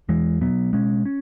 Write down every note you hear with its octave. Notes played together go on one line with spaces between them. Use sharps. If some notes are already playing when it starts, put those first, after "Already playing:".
E2 E3 G#3
B2 F#3 B3
B2 G#3 C#4
C#4